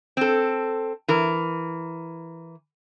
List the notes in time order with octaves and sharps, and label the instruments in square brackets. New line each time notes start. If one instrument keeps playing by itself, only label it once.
[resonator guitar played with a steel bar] C4 A4
E3 A#4